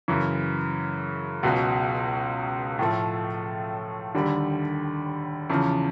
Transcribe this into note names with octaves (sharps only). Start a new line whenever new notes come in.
F#2 C#3 E3
C#2 B2 F#3
A2 F3 A3
D#2 D3 G3
E2 C#3 F3